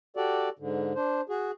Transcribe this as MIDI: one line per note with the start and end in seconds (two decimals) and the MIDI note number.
0.17 0.49 66
0.17 0.49 67
0.17 0.49 69
0.17 0.49 74
0.59 0.93 44
0.59 0.93 50
0.95 1.21 62
0.95 1.21 72
1.29 1.51 66
1.29 1.51 68